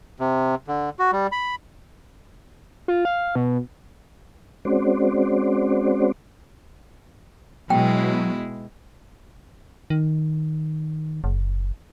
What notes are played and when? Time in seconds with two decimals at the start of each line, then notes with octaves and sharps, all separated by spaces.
0.20 C3
0.68 D3
0.99 F#4
1.13 G3
1.32 B5
2.88 F4
3.05 F5
3.35 B2
4.65 G#3 C4 C#4 F#4 C5 D5
7.70 B2 F#3 G#3 E4 G5
9.90 D#3
11.24 F#1